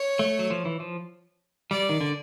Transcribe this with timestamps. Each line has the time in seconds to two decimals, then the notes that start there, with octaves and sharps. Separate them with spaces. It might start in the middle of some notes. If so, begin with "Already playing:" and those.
Already playing: C#5
0.19 A3
0.39 F#3
0.50 F3
0.65 E3
0.80 F3
1.71 G3 D5
1.89 D#3
2.01 D3